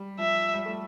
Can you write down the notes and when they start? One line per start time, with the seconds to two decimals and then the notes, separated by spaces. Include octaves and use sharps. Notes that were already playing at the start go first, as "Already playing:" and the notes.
Already playing: G3
0.18 F3 E5
0.54 G3
0.66 A3